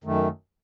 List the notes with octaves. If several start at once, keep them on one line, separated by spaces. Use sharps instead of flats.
F#2 D#3 A3